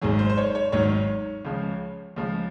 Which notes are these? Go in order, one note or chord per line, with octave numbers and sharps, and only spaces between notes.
G#1 G#2 D#3 F#3 G#4
C5
C5
C#5
C#5
G#1 G#2 D#3 F#3 C#5
C#2 C#3 F3
C#2 C#3 F3